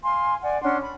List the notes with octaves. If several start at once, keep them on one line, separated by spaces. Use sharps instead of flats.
F5 G#5 C6
D5 F#5 G#5
C#4 D4 F#5 C6
B5